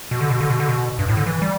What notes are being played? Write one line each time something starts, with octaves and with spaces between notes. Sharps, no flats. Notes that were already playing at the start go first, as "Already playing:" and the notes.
B2
D3
B2
D3
B2
D3
B2
G2
A2
D3
E3
G3